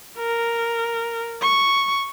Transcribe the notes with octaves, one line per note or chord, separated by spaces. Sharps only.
A#4
C#6